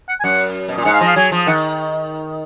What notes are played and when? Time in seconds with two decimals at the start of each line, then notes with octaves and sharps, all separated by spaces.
0.09 F#5
0.20 G#5
0.24 F#2 F#5
0.68 B2
0.78 A#2
0.85 G#2 F#5
0.93 F5
1.01 F3 D#5
1.08 F5
1.16 F#3 G#5
1.32 F3
1.47 D#3 F#5